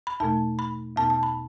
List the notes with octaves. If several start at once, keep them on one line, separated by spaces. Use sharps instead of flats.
B5
E2 B2 A3 A5
B5
E2 B2 B3 A5
A5
B5